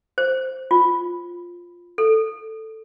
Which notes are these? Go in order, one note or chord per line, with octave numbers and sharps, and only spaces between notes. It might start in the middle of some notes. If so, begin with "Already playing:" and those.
C5
F4
A4